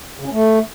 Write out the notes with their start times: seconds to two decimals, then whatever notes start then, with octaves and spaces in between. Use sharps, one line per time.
0.20 C#3
0.26 C#4
0.32 A3